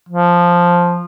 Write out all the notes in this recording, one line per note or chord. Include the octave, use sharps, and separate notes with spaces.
F3